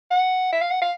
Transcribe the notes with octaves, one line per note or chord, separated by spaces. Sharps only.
F#5
E5
F5
F#5
F5